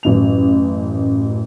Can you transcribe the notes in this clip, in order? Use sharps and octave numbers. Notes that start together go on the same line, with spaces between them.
A1 F#2 F7